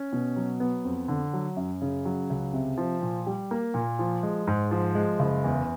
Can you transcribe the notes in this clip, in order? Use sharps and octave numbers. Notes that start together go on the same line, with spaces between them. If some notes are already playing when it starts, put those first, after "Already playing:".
Already playing: C#4
B2
F#3
B3
F2
D3
F#3
F#2
C#3
F#3
C#2
C3
F3
A#2
G3
A#3
A#2
F3
G#3
G#2
F3
G#3
F#1
E2